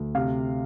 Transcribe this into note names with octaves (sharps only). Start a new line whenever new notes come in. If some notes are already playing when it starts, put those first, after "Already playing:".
Already playing: D2
C3 F5